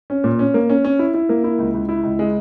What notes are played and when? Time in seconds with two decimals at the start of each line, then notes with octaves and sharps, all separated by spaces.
0.10 C#4
0.24 A#2
0.39 C#4
0.54 A#3
0.70 C#4
0.85 C#4
0.99 E4
1.14 E4
1.29 A#3
1.44 E4
1.59 C#2
1.74 C#2
1.89 E4
2.03 C#2
2.19 G#3